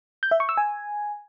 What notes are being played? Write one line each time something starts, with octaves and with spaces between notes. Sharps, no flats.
G6
E5
C#6
E6
G#5